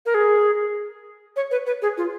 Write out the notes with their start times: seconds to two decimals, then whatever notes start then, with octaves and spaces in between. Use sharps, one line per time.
0.06 A#4
0.14 G#4
1.36 C#5
1.51 B4
1.67 B4
1.82 G#4
1.98 F4